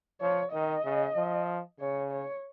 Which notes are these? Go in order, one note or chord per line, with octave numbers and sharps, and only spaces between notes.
F3 C#5
D#3 D#5
C#3
F3
C#3 C#5
C#5